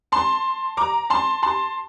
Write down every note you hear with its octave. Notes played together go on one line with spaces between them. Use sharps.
A5 C6
A#5 D6
A5 C6
A5 C6